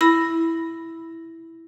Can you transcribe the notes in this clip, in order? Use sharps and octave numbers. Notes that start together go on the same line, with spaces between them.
E4 B5 A#6